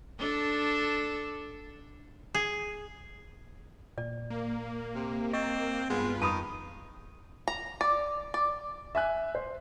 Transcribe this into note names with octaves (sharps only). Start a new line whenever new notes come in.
D4 A4
G#4
A#2 D5
A#3
C3
C4 D#5 C#6
G2 G#3 B3 F4 B4
F2 D#3 A5 B5 D#6
A#5
D5
D5
E5 G#5 F#6
C5